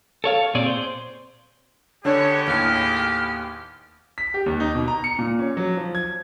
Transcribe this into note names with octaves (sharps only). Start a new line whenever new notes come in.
A4 C#5 F5
A#2 C4 G#4 C#5 D5
C5
D3 G#3 B3 D4 G4 C#5
D#2 A2 F6
B6
G4
D#2
D#4
B2
A#5
C#7
A#2
C#4
F#3
F3
G#6